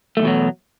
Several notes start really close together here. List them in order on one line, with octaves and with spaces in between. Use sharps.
A3 G#2 E2 B2 F#3